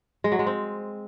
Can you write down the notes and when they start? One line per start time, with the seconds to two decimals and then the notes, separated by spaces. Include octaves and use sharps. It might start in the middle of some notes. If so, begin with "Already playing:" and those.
0.24 G#3
0.32 F#3
0.39 G#3
0.47 C4